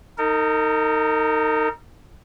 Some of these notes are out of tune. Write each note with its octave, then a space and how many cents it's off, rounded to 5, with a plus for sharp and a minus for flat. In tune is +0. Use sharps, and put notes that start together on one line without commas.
D#4 +5 A#4 -40